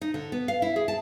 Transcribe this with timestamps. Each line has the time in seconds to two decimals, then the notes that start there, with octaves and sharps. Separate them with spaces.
0.01 D#4
0.14 D3
0.32 B3
0.48 F5
0.62 E4
0.76 G#4
0.88 A5